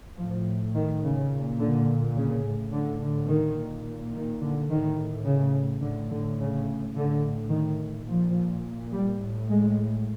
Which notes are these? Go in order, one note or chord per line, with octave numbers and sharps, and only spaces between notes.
A2 F3
D#3
C#3
A#2
D3
C#3
A2
D3
D3
D#3
A#2
D#3
D3
A2 D#3
C#3
A2 D3
D3
C#3
A2 D3
D#3
A#2 F3
G3
A2
G#3